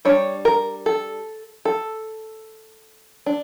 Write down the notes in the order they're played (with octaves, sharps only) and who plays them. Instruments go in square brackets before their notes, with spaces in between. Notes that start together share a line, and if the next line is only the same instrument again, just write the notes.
[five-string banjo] G3 D4 C#5
A#4
A4
A4
D4